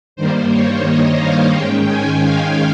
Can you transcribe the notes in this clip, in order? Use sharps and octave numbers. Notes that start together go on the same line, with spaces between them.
G2 D#3 G3 A#3 C5
C#5
D#5
F5
G#2 D#3 G#3 C#4 G5
G#5
F5